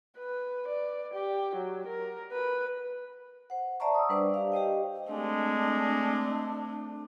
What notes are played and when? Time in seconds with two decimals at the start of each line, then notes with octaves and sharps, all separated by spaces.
0.18 B4
0.68 D5
1.14 G4
1.56 F#3
1.88 A#4
2.32 B4
3.50 C5 F#5
3.80 C5 D5 E5 A5 A#5 C#6
3.94 D#6 E6
4.09 G3 D4 B4 C5 D5 D6
4.34 G4 D5 F5
4.52 G4 C5 D#5 G5
5.09 G#3 A3 C4 D4